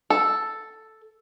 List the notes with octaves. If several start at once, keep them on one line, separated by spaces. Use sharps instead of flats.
A4